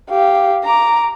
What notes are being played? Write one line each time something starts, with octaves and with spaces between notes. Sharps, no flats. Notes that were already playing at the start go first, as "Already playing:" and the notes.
G4 F5
A#5 D6